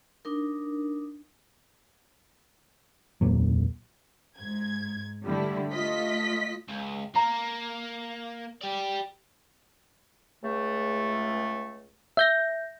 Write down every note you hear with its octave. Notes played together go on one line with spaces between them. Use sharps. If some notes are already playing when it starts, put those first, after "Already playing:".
D4 D#4 A#4
E1 C#2 A#2 F#3
G#2 G#6
D3 G3 A3 E4
A3 F4 D#5 B6
C#2
A#3 A#5
G4 D5
C#2 A3
E5 G6 A#6